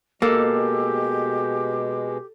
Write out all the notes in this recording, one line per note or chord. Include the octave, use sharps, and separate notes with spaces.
B2 G#3 A#3 G4 A4